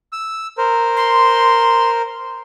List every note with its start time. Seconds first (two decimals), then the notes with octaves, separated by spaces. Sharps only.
0.13 E6
0.58 A#4 C5
0.97 C6